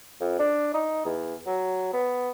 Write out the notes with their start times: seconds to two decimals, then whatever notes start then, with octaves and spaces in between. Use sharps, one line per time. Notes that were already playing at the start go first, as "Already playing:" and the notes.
0.20 F2
0.39 D4
0.74 D#4
1.05 E2
1.46 F#3
1.93 B3